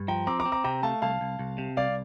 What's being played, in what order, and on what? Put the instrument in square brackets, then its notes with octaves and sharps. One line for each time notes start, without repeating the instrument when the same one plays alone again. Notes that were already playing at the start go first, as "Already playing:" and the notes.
Already playing: [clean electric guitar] G2
[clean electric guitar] F3 [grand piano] G5 A#5
[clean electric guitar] C4 [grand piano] A#5 D6
[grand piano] A#5 D6
[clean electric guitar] C4
[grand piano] A#5 D6
[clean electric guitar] C3 [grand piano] G5 A#5
[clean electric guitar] A3 [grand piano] F5 A5
[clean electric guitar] C2 [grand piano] F5 A5
[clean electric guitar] C2
C2
C3
[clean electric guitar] C2 [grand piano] D5 F5